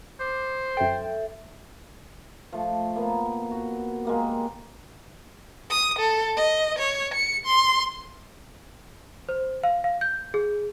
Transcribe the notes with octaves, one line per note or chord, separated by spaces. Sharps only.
C5 D6
F#2 A4 E5 G5
F3 A3
A#3 B3
F#4
G#3 A#3 G4
D#6
A4
D#5
C#5
C#7
C6
C5
F5
F5
G6
G#4